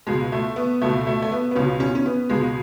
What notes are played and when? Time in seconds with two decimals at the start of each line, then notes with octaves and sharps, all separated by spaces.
0.07 C#2 B2 G#3
0.32 A3
0.56 B3
0.81 C#2 B2 A3
1.07 A3
1.22 A3
1.32 B3
1.51 B3
1.55 C#2 B2 C#4
1.80 C#4
1.95 C#4
2.06 B3
2.29 C#2 B2 G#3